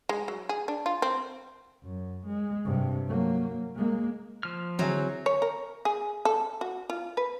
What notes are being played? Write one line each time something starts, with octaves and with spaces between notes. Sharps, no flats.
G#3
F#3
G#4
D4
F4
C4
F#2
G#3
G2 C3
F#3 A#3
G#3 A#3
F3 F6
D3 F#3 C4 E4 G#4
C#5
A#4
G#4
A4
F#4
F4
B4